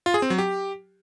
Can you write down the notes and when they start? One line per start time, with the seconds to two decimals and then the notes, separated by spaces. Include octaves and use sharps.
0.06 F4
0.14 G#4
0.22 C4
0.30 F#3
0.38 G4